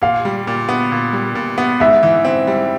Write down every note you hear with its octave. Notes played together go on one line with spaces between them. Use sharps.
A#2 F5
G3
A#2
B3
A#2
G3
A#2
B3
G#2 E5
E3
C4
G3